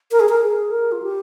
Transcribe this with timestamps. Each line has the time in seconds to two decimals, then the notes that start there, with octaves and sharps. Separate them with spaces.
0.12 A#4
0.20 G#4
0.29 A#4
0.42 G#4
0.71 A#4
0.92 F4
1.02 G4